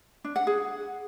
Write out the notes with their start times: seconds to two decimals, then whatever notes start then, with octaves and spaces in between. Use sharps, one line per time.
0.24 D4
0.36 F#5
0.47 G#4